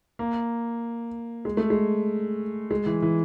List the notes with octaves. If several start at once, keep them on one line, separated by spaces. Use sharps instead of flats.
A#3
G#3
A3
G#3
G#3
E3
E3